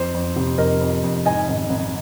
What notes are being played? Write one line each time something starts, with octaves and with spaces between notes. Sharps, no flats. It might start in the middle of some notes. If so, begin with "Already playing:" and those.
Already playing: F2 C5
F2
C3
F2 A#4 D#5
F2
F2
G#2 D#5 G#5
G#1
G#1